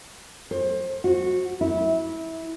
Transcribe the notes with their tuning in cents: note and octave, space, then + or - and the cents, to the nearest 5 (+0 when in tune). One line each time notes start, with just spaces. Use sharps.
C5 +30
F#4 -15
E4 -20